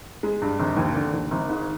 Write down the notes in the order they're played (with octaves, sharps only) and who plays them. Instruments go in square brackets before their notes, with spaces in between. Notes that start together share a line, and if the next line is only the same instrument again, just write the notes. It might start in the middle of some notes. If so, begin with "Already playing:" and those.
[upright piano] G#3
G2
G#1
D#2
D3
D#2
G#1
G#2